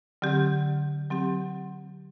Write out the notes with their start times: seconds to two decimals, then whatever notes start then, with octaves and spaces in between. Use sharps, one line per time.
0.22 D3 F#3 C4 G4
1.10 F#3 C4 G4